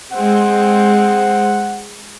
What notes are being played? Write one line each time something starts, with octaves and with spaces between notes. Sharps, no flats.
G#3 C4 F#5